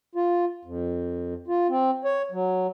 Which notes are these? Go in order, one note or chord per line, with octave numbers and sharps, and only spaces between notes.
F4
F2
F4
C4
C#5
F#3